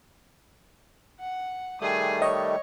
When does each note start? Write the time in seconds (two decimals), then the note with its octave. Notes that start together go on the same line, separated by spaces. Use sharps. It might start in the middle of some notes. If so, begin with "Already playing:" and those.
1.20 F#5
1.81 D#3 G3 A3 G#4 D#6
2.22 C#5 D#5